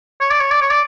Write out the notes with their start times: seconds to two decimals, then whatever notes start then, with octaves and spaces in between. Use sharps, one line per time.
0.21 C#5
0.31 D5
0.40 C#5
0.51 D5
0.62 C#5
0.71 D5